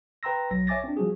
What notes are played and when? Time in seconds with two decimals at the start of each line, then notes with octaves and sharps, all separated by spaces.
0.23 B4 G5 A#5 C6 E6 A#6
0.51 B1 F#3 A#6
0.67 C#5 E5 G#5 D6 A6 A#6
0.84 C4 D4
0.97 F3 G3 F#4 G#4